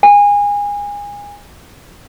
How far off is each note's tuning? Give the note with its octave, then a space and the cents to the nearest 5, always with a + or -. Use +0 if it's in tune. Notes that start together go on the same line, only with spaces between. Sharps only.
G#5 -25